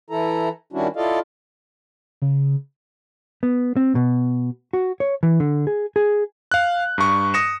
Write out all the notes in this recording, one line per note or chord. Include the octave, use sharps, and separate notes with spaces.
E3 E4 A4 A#5
D#3 G3 C#4 D4 E4 F#4
E4 F4 A4 D5 D#5 F5
C#3
B3
C4
B2
F#4
C#5
E3
D3
G#4
G#4
F5 F#6
G2 C#6
D#6 A#6 C#7 E7